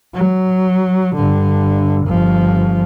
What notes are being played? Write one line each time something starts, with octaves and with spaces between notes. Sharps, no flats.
F#3
G2 D3
G1 F3